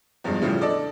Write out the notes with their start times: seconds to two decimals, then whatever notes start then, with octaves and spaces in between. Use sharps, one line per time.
0.24 E2 G2 B2 F3 G#3
0.42 A2 C#3 E3 F3 G3
0.61 D4 A4 D5 D#5